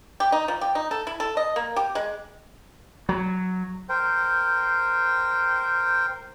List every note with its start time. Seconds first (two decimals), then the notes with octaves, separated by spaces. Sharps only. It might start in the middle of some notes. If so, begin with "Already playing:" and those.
0.20 G4
0.32 D#4
0.48 F3
0.61 G4
0.75 D#4
0.91 A4
1.07 E4
1.20 A4
1.37 D#5
1.56 A#3
1.76 G4
1.95 G#3
3.09 F#3
3.89 A#4 C5 G5